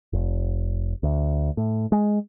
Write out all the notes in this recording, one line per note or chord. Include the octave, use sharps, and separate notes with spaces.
F1
D2
A2
G#3